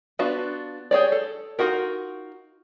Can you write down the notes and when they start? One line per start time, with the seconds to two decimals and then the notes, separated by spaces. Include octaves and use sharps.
0.19 B3 D4 F4 F#4 B4
0.91 G4 G#4 C#5 D5
1.12 A4
1.59 D#4 F4 F#4 A#4